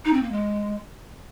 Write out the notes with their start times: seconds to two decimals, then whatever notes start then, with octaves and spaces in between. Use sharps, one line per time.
0.05 D#4
0.13 C4
0.23 A#3
0.32 G#3